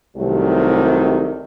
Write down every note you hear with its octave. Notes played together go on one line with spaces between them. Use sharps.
C2 C3 D#3 F#3 G3 A3